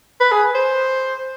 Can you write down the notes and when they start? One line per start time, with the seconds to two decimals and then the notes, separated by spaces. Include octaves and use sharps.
0.20 B4
0.32 G#4
0.55 C5